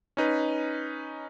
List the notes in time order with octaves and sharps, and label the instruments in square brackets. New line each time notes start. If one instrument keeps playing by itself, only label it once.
[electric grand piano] C#4 D#4 B4